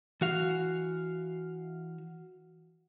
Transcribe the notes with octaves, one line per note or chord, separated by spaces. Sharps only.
E3 F#4 F5